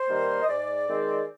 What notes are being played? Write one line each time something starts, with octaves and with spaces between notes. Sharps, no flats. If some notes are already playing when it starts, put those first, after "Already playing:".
Already playing: C5
D#3 G3 A#3
D#5
G#2 D5
D#3 G#3 C4